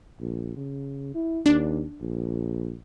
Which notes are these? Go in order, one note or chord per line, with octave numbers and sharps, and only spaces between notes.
A#1
C#3
E4
D#2 D4
A#1